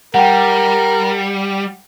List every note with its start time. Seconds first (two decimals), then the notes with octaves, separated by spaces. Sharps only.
0.14 G3 A#4 F#5 G5